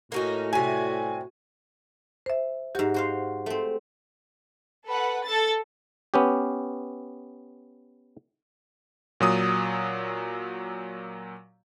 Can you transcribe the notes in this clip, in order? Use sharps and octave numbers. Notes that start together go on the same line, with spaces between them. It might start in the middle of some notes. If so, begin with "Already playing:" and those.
A2 A#3 C#4 D#4 F#4
C3 G3 F#4 G#5
C5 E5
G#2 F#4 G4
F#4 C5 F5
A3 C4
A4 B4 F#5
A4 A6
B3 C#4 G4
A#2 F#3 D#6